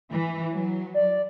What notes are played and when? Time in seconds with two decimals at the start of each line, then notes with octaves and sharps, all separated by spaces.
0.11 E3
0.54 F#3
0.94 D5